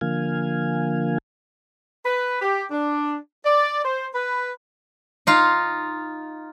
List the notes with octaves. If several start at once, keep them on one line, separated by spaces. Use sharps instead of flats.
D3 F3 A#3 F5 G#5
B4
G4
D4
D5
C5
B4
D#4 F4 F5